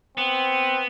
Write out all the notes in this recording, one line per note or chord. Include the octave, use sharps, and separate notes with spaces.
B3 C4